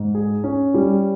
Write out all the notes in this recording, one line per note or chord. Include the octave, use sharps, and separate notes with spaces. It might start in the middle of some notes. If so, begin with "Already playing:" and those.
Already playing: G#2
G#4
C#4
G3